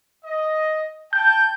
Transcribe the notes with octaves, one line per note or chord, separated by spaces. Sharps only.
D#5
G5 A5 G6